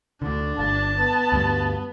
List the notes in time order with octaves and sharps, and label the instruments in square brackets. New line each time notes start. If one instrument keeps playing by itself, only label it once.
[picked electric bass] D2 D3 [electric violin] D4
[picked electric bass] G1 [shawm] A5
[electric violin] B3
[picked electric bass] D2 G2 G3